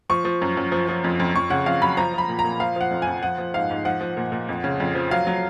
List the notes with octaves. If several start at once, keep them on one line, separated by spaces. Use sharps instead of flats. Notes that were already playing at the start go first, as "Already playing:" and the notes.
F3 C#6
F3
F#2
F#2
F3
F3
F2
F2
F2 C#6
C#3 F#5
F2 F5
F#3 B5
F3 A#5
F3 B5
A#2
A#5
A#2
F3 F5
F3 F#5
F2
F2 G#5
F3 F#5
F3
G#2 F5
G#2
F3 F#5
F3
A#2
A#2
F2
C#3
F2
F3
F#3 F5
F#3